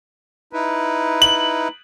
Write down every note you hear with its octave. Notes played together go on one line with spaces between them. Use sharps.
D#4 E4 B4
F#7